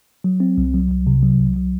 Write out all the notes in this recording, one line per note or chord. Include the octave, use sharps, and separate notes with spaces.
F#3
C4
C2
F#3
C2
C3
F#3
C2
F#3